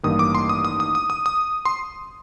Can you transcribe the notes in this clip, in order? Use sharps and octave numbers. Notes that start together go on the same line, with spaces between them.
A1 G2 D#3 A#3 D#6
D6
C6
D#6
D#6
D#6
D#6
D#6
D#6
C6